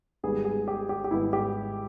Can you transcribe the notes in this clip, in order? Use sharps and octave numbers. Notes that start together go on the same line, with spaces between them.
G#1 G#2 G3 B3 G#4
G#4
G4
G4
G4
G#1 G#2 G3 B3 E4
G4